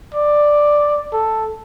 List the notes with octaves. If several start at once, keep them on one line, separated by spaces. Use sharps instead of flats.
D5
A4